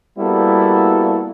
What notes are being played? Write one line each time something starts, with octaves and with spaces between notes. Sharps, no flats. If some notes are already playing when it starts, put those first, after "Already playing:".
G3 A#3 B3 E4 F#4 A4